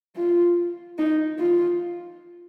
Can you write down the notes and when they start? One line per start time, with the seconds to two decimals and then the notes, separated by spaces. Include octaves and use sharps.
0.17 F4
0.98 D#4
1.39 F4